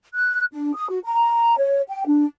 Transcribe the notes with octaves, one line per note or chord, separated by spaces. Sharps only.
F#6
D4
D#6
F#4
A#5
C#5
G5
D4